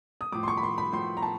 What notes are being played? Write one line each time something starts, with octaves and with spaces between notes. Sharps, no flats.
D#6
A2 F3 D6
C6
C#6
B5
C6
B5
A2 F3 C6
A#5
A5